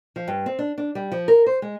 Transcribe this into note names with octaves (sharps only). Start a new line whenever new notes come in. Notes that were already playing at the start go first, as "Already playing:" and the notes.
F3
G2
C4
D4
D4
G3
F3
A#4
C5
G#3